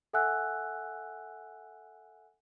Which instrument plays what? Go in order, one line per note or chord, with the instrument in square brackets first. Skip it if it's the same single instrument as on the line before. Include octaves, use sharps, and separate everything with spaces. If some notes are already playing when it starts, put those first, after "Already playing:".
[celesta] A4 E5 F#5 G#5 E6 F#6